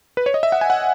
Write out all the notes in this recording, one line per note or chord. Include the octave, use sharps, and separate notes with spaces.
B4
C#5
D#5
E5
F#5
G#5
F#5